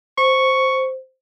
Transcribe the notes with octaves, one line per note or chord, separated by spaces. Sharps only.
C5 C#6